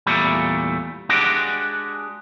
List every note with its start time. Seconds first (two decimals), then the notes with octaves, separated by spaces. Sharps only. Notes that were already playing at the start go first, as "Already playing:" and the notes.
0.06 E2 A#2 G3 A3
1.09 G#3 D4 F#4 G4